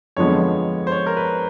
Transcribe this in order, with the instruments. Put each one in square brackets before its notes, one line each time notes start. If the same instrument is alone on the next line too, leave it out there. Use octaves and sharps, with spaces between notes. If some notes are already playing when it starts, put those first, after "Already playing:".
[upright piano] F2 D3 F3 G#3 B3 [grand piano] C#5
[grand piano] C5
C#5
A#4
B4